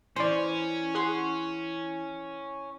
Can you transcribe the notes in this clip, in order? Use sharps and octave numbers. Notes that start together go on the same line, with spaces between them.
E3 C#4 C5 D5
G#4 F#5 C6